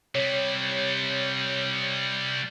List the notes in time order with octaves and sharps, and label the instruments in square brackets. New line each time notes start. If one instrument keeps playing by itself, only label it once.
[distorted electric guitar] C3 G3 [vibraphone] C#5